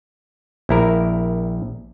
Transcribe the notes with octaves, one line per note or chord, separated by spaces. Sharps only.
A#1 E4 A#4